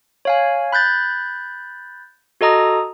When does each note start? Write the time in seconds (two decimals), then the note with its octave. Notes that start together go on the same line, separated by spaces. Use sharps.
0.25 C#5 F5 G#5
0.72 B5 F#6 G6 A6
2.41 F#4 A4 D#5 A#5 D#6